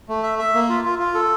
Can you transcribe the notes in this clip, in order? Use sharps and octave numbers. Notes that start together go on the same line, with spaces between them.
A3
E5
E5
A#3
F4
F4
F4
A4